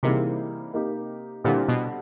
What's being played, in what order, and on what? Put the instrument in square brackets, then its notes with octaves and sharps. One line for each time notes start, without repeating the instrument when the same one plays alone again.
[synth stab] C3 [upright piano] E3 G3 A#3 D#4 G#4
[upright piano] A#3 D#4 G4
[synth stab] A#2 [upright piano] D3 G3 C4 E4 G4
[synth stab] B2